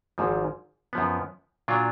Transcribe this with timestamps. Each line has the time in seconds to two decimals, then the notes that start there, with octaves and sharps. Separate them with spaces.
0.18 G#1 G#2 F3
0.93 F#2 F3 B3
1.68 A#2 F#3 D4 F4